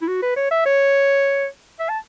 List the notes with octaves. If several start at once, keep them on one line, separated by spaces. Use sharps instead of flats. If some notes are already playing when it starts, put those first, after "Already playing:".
E4
F#4
B4
C#5
E5
C#5
E5
A5